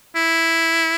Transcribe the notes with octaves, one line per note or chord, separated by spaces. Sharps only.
E4